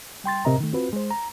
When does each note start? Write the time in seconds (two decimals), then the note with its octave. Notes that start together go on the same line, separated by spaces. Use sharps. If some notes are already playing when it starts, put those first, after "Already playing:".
0.24 G3 G5 C6 A6
0.45 A2 C3 A#4 D#5 E5 A#5
0.60 D#3 A3
0.73 C4 F4 F#4 B4
0.93 G#3 C5
1.11 A#5